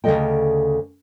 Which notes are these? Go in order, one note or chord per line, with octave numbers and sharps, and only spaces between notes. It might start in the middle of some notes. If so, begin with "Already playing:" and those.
D2 C#3 F#3 A4 D#5 G5